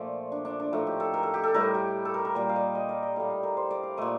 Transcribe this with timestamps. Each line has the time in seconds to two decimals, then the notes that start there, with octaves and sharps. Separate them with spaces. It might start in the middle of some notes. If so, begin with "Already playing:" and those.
Already playing: A#2 F3 A3 C5 D5
0.32 D4
0.45 D4
0.60 D4
0.73 A2 F3 A3 D#4
0.87 G4
1.00 A4
1.14 A#4
1.23 A4
1.34 G4
1.44 A4
1.54 A2 G3 A#4
1.75 G4
2.05 A4
2.14 A#4
2.25 A#4
2.35 A#2 G3 D5
2.49 F5
2.56 D#5
2.75 D#5
2.89 D5
3.03 D#5
3.16 A2 G3 F5
3.30 F5
3.43 A#4
3.57 C5
3.71 D5
3.83 F5
3.97 A#2 A3 D#5